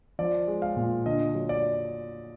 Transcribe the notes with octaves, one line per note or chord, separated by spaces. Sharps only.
F3 D5
G#3
F5
A#2
D3 D#5
F#3
D5